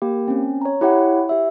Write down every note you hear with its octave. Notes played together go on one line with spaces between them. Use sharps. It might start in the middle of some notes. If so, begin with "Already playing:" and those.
A#3 G4
C4 C#4
C#5 A#5
E4 G4 C#5 F#5
G4 E5